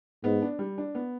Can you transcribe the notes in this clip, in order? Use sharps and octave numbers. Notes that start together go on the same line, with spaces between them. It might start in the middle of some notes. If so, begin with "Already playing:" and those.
G#2 B3
D4
G3
D4
B3